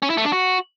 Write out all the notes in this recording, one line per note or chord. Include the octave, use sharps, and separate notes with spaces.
C#4
E4
A3
D4
F#4